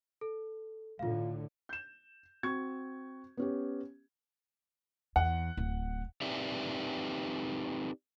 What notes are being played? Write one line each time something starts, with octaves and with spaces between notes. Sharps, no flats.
A4
A2 D3 F4 F5
G6 E7
C4 F#4 C#6 G#6
B3 C#4 G4
E2 F#5
D1
C4 D#4 G4 B4 D5 E5